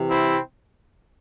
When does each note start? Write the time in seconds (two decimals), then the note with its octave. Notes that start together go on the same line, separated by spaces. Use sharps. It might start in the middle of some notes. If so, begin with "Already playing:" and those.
Already playing: C3 E3
0.09 C4 E4